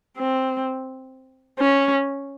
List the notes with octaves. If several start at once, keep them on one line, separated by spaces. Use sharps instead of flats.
C4
C#4